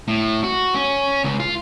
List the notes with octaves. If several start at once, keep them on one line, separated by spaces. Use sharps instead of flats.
A2
F#4
C#4
C#2
F4